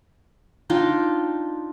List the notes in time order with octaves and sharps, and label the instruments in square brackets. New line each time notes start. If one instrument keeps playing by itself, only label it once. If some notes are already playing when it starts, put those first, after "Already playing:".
[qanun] D4 D#4 F4 G5